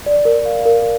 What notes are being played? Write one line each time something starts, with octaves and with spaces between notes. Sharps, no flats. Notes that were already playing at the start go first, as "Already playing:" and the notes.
D5
A#4
F5
A#4